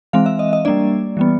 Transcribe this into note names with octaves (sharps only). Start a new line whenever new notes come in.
E3 G#3 C4 F5
E5
D#5
D#5
G3 A#3 D4 D5
E3 G3 B3